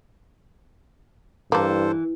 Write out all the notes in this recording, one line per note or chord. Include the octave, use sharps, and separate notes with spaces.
G2 E3 A#3 D4 A4 C5